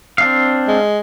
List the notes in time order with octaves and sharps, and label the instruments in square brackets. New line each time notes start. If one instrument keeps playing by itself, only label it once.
[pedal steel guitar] C4 D4 F5
[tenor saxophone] G#3